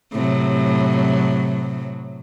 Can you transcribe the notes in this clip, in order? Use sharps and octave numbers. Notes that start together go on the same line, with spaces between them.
A2 C3 F#3